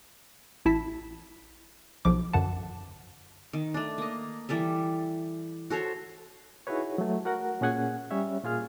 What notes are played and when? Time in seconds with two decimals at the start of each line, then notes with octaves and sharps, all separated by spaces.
0.65 A1 E4 A5 B6
2.05 B1 F3 D6
2.33 F#2 D3 F#5 A5
3.53 D#3
3.74 A3 D4
3.98 A#3 D#5
4.49 E3 G3 A4 E5
5.70 F#4 A4 C5 C#5
6.67 D#4 E4 F#4 G#4 B4 C#5
6.98 F#3 A3
7.25 F#4 A#4 F#5
7.61 A#2 C#4 G#4 F#5 G#5
8.11 G3 C#4 C#5 E5
8.43 A#2 F4 G#4 F6